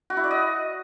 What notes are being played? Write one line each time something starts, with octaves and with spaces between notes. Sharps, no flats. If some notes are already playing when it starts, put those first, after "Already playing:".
F#4
E4
D5
D#5